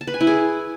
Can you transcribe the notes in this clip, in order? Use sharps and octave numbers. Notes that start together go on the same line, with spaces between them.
A5
B4
G#5
E4
G#4